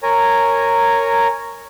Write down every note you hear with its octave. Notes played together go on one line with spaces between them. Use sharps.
A#4 C#5 G#5 A#5